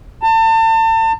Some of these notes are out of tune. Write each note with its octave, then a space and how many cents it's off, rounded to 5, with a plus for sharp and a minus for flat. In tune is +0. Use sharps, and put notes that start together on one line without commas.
A5 +35